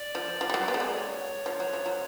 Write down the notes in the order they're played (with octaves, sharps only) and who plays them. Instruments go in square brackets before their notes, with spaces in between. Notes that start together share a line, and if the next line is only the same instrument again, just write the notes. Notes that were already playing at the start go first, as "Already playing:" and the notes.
Already playing: [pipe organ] D5
[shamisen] F3
F3
G3
F#3
B3
A3
G#3
[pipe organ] C#5
[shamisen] F3
F#3
F3
F#3